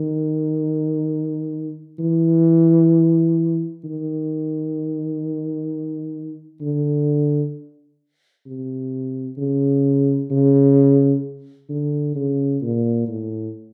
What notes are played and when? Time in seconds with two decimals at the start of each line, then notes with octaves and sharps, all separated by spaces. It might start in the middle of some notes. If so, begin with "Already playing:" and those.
Already playing: D#3
1.99 E3
3.84 D#3
6.61 D3
8.46 C3
9.38 C#3
10.31 C#3
11.69 D3
12.15 C#3
12.62 A#2
13.08 A2